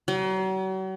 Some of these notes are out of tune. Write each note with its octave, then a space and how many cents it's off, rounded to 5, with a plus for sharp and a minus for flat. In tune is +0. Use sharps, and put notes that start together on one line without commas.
F#3 +40